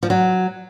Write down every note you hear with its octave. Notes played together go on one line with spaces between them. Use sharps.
F3
F#3